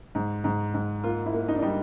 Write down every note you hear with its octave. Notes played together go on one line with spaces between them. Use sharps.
G#2
G#2
G#2
A#3 F4
E4
A#3
D#4
D4
G3 D#4